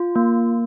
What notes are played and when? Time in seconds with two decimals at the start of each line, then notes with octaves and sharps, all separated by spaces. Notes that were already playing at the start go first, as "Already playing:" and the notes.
Already playing: F4
0.16 A#3